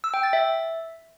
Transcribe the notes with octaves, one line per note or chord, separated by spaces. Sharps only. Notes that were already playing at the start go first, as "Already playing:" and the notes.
E6
G5
A6
E5